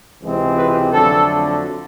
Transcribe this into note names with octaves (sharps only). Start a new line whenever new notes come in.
C#2 C3 E3 G#3 C4
B4
F2 D3 F#3 A3 A4